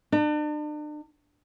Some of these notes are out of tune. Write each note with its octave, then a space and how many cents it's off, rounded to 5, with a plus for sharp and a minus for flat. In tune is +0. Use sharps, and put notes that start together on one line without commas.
D4 +40